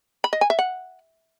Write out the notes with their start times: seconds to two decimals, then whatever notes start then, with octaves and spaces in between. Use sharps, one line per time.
0.24 B5
0.33 D#5
0.41 G#5
0.50 E5
0.59 F#5